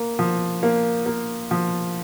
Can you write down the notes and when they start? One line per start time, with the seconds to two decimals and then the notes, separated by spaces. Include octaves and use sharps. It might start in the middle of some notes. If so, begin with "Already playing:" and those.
Already playing: A#3
0.19 F3
0.63 A#3
1.06 A#3
1.51 F3